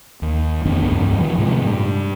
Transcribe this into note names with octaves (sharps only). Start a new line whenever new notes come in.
D#2
F2 D#3 B3 D4
C#2 G2
D#3 F3
A2 C3 G#3
G2